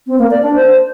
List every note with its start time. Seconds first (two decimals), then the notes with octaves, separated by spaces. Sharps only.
0.07 C4
0.19 A#3
0.31 D5
0.43 D4
0.54 C5